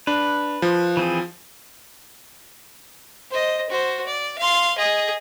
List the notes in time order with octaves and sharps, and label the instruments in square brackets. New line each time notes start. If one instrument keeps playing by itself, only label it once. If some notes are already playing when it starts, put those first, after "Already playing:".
[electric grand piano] D4 [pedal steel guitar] B4
[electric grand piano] F3
[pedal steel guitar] E3 C4 G#4
[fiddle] C5 D#5
F#4 C5
D5
F5 C6
G#4 D#5